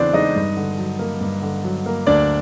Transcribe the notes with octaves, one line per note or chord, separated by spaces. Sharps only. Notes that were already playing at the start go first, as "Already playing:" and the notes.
Already playing: E2 C#3 E3 B3 C4 D4 C5 D5
G#3 D#4 D#5
G2
D3
F#3
A#3
G2
D3
F#3
A#3
D2 D4 D5